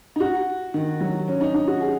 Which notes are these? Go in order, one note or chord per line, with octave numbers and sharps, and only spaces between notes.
D#4
F#4
D#3
F#3
C#4
D#4
D#4
F#4
G#4